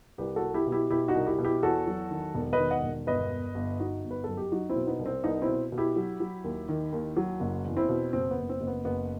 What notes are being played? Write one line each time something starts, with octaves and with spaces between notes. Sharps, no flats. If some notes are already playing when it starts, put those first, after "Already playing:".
C2 G4 B4
F#4 A4
C2
E4 G4
B2
E4 G4
B2 E4 G4
D#4 F#4
C2
E4 G4
B2
E4 G4
E2 F#4 A4
F#3
D#3
E1
B4 D#5
D#3
D#5 F#5
E1
G1 B4 D#5
G1
G1
G1 D#4 F#4
G1
B4
F#2 A4
G4
F#3 D#4 F#4
C4 E4
B2
B3 D#4
C2
C4
C2 B3 D#4
C4 E4
B2
B2
E4 G4
F#3
F#3
D#2
D#3
D#2
F#3
F#1
E2
C4 E4
B2
F#1 C4
B3
F#1
C4
F#1
B3
F#1 B3